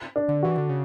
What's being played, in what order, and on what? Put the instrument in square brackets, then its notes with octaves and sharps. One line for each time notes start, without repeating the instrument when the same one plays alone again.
[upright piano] D4
[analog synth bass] D3
[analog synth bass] E3 [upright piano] F#4
[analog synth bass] D3
C#3